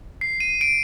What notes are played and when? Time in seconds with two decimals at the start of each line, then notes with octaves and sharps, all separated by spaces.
0.21 C7
0.40 D#7
0.61 D7